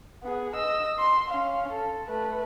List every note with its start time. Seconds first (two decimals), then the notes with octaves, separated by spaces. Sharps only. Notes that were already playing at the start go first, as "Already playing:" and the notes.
0.23 B3 G#4
0.55 D#5 E6
0.98 C6
1.30 C#4 F5
1.73 A4
2.06 A3 B4